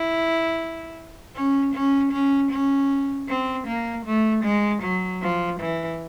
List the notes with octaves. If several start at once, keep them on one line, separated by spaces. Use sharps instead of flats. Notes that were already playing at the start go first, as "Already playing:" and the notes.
Already playing: E4
C#4
C#4
C#4
C#4
C4
A#3
A3
G#3
F#3
F3
E3